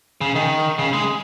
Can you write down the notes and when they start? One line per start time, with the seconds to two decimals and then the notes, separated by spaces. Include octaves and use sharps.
0.21 C#3
0.35 D#3
0.79 C#3
0.93 G#3